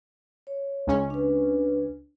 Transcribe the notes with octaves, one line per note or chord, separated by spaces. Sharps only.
C#5
C#2 C#4
D4 B4